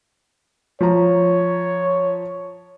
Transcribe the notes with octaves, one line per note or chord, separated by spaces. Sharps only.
F3 C#5 A#5